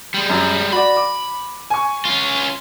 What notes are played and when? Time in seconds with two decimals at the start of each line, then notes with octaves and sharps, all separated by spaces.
0.14 G3 G#3
0.30 F#2
0.72 F#4 D5 B5
0.96 D6
1.70 G#5 C#6
2.05 C#4 F4